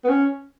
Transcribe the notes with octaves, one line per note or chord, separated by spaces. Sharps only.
B3
C#4